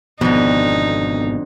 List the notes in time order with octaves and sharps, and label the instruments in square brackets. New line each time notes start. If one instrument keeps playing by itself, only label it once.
[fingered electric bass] G#1 B2 [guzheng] F2 D3 [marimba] B3 [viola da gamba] D#4